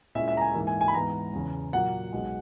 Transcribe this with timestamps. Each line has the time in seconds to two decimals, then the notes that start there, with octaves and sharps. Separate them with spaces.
0.15 A#2 G#3 C#4 E4 E5
0.28 E5
0.37 A#5
0.41 G#5
0.54 G#2 E3 A#3 E4
0.67 G#5
0.81 G#5
0.88 B5
0.94 G#2 E3 B3 A#5
1.33 E2 C#3 E3
1.73 A#2 F#3 A#3 F#5
2.12 B1 B2 G#3